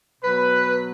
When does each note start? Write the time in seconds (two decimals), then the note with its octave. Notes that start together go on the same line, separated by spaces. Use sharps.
0.22 B2 F#3 B4